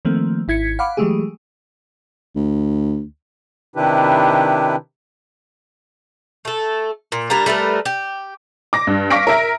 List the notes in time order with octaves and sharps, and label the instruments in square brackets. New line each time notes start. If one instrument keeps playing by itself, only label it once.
[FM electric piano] D#3 F3 A3 A#3 C4
G#1 E4 G#6 B6 C#7
F5 F#5 B5 D6
E3 F#3 G#3 A3 G4 G#4
[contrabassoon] D2
[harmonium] C3 D#3 D4 E4 G4 B4
[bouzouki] A3 A4
A#2
G3 A#3 D4 A#5
G3 A3 A#4 B4
G4
[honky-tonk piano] D6 A#6
G2
F5 C#6 D6 A#6 B6 D7
A#4 E5 A#6